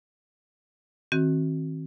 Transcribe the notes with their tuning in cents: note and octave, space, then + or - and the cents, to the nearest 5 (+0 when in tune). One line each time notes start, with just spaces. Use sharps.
D#3 +30 C4 +25 F#4 +0